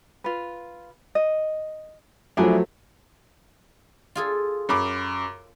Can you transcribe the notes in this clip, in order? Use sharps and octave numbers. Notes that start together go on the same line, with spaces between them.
F4 B4
D#5
F3 F#3 A3 D4 E4 G#4
F4 G#4 A4
F#2 B5 D6